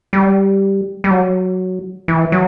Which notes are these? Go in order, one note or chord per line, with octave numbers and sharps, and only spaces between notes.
G3
G3
F#3
E3
F#3